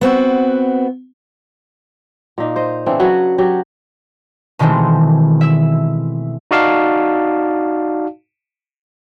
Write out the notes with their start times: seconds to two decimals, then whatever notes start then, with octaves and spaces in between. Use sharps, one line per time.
0.01 B3 C4 F#4
2.38 A#2 A#3 D#4
2.56 C5 D#5
2.86 C#3 E3 C4 D4
3.00 F#3 F#4 B4
3.38 F#3 F#4 G4
4.59 B2 D#3 E3 G#3 A3 C4
5.41 E5 E6
6.51 D#4 F#4 D5 F5 A5